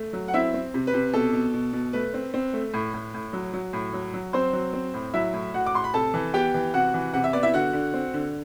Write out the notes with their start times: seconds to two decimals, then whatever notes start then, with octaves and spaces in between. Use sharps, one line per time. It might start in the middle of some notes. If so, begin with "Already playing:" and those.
Already playing: A3
0.13 F#3
0.28 F#5
0.34 C4 E4 E5
0.54 C4
0.74 C3
0.87 B4
0.94 C3
1.14 B2 A4
1.33 B2
1.54 B2
1.73 B2
1.93 A3 B4
2.14 C4
2.34 C4
2.53 A3
2.74 A2
2.94 A2
3.14 A2
3.33 F#3
3.53 F#3
3.73 A2
3.93 F#3
4.14 F#3
4.33 F#3 C4 C5
4.53 F#3
4.73 C4
4.94 A2
5.14 F#3 E4 E5
5.34 A2
5.54 A2 F#4 F#5
5.66 D6
5.74 A2 C6
5.84 B5
5.94 C3 A4 A5
6.14 E3
6.34 B3 G4 G5
6.54 E3
6.74 C3 F#4 F#5
6.94 E3
7.13 C3 F#5
7.24 E5
7.33 B3 D5
7.43 E4 E5
7.54 D3 F#4 F#5
7.73 D3
7.94 C4
8.14 D3